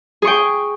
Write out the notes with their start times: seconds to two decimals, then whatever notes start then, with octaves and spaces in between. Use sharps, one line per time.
0.22 G#4
0.25 C#6
0.27 G5